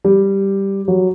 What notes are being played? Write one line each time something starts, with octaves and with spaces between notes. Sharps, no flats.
G3
F#3